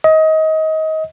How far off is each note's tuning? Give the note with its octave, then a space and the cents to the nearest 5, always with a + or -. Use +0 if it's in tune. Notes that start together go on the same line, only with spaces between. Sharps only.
D#5 +25